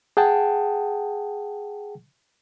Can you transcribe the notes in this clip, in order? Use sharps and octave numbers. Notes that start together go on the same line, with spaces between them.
G#4 F#5 G5 A5